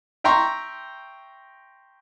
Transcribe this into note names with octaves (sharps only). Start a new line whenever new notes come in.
E5 G5 A#5 C6 C#6